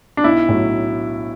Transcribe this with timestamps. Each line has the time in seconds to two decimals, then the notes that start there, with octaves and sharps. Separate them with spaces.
0.17 D4
0.24 B1 E4
0.49 A2 F#3